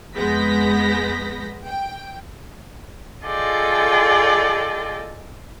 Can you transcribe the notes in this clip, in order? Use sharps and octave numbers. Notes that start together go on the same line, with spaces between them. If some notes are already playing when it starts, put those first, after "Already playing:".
F2 G#3 B3 G6 A#6 B6
G5
F4 G#4 A4 D5 D#5 G5